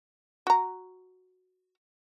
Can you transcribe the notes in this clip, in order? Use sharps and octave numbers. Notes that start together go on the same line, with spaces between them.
F#4 A#5